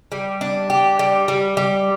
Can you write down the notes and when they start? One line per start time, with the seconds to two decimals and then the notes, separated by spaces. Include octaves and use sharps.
0.12 G3
0.41 D4
0.70 G4
0.99 G3
1.28 G3
1.57 G3